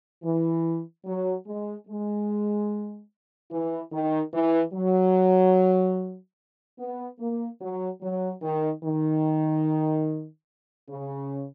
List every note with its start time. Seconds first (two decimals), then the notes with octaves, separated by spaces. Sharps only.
0.23 E3
1.06 F#3
1.46 G#3
1.88 G#3
3.51 E3
3.92 D#3
4.34 E3
4.74 F#3
6.79 B3
7.20 A#3
7.61 F#3
8.02 F#3
8.42 D#3
8.84 D#3
10.89 C#3